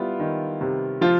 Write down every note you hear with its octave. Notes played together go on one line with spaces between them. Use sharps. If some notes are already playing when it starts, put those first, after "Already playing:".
Already playing: G3 B3 E4 F4
D#3
C3
F3 F4